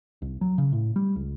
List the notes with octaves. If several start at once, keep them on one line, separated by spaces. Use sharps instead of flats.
C2
F#3
C#3
A2
G3
C#2